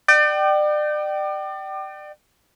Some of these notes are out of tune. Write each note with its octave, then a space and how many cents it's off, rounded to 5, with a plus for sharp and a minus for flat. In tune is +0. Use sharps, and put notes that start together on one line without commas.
D5 +35 G5 -25